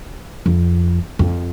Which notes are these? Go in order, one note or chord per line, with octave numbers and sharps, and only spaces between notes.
F2
F2